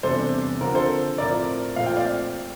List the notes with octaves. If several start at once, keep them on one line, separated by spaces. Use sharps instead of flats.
E2 C3 G3 D4 A4 C5
D3 F3 C4 A#4
A4 C5
A2 F3 C4 A#4 D5
A#2 F3 A3 C4 F5
G5
D5 F5